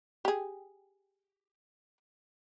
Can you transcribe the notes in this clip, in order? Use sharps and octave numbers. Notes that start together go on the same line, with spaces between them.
G4 G#4